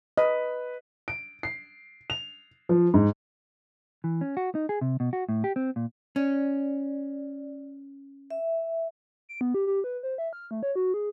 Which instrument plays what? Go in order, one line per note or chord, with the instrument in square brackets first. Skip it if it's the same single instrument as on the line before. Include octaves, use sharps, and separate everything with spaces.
[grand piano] B4 [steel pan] D#5
[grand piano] D7
C7
F7
F3
G#2
[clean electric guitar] E3
C#4
F#4
D#4
G#4
C3
B2
F#4
A2
G4
C4
A#2
[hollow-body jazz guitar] C#4 [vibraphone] D5
[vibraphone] E5
[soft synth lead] D7
B3
G4
G4
B4
C5
E5
F6
A3
C#5
F#4
G#4